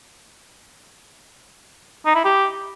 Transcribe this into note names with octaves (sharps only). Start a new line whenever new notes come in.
D#4
E4
G4